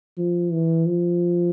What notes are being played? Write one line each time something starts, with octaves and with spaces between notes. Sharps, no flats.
F3
E3
F3